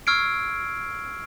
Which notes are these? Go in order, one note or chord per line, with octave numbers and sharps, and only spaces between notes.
C#6 E6 F6 G#6 C7 D7